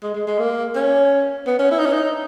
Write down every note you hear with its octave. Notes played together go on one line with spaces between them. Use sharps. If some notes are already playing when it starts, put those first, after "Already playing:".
G#3
G#3
G#3
A#3
C#4
B3
C#4
E4
D#4
C#4
D#4